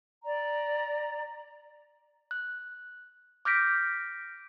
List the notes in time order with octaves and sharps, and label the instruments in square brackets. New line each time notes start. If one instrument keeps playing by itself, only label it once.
[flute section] D5 A#5
[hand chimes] F#6
D6 F6 G6 A#6 B6 D7